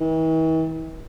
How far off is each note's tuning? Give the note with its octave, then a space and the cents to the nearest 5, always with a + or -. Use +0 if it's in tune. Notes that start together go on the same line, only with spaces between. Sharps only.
E3 -45